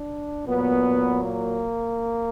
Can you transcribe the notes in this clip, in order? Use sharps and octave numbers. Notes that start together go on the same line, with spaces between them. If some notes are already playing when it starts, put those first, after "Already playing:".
Already playing: D4
A#2 F#3 B3
A#3